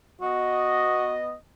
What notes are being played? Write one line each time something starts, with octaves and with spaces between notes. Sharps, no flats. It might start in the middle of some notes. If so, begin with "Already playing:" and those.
B3 F#4 D#5